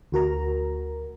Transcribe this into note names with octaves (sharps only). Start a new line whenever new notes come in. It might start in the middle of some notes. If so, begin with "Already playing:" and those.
D2 F#4 A#4 A#5